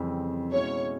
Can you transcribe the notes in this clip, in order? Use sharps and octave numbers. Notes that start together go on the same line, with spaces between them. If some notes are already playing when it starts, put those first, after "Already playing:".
Already playing: F2 C#3 E3 G3 C4
B2 G#3 C#4 E4 C#5